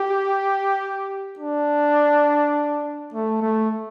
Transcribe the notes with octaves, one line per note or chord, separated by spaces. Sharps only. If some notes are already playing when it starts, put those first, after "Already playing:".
Already playing: G4
D4
A3
A3